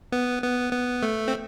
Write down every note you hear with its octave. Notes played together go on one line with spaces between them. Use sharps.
B3
B3
B3
A3
C4